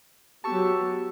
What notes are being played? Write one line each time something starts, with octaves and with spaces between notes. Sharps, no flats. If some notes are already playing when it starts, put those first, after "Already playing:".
F#3 B3 G4 A5 C#6 E6